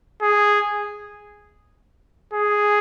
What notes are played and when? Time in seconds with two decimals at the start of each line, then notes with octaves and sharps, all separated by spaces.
0.22 G#4
2.34 G#4